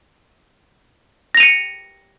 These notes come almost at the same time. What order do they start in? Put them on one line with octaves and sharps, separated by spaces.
A#6 F7 D#7 C#7